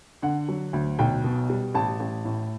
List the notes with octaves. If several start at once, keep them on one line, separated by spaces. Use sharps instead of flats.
D3 F#5
F#3
D2
B1 G5
B2
G3
A1 A5
A1
A2